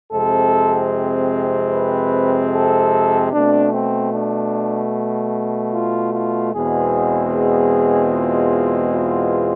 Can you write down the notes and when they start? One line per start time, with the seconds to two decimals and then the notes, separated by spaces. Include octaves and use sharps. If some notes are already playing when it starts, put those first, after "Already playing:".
0.12 F2 C3 G#3 C4 A4
1.72 B4
2.53 A4
3.33 B2 A3 C4 D4
3.73 C4
4.13 D4
5.74 F4
6.13 F4
6.54 E2 B2 G#3 C4 G#4
7.34 G#4
8.14 F4
8.94 F4